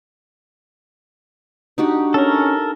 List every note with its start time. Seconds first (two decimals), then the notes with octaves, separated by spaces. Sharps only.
1.78 D4 D#4 F#4 G4
2.14 C#4 A4 A#4